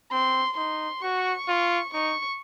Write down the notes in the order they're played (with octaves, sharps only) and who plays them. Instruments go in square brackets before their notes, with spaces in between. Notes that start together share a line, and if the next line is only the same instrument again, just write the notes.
[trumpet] C4 [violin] C6
[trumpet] D#4 [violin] C6
[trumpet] F#4 [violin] C#6
[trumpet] F4
[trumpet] D#4 [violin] C#6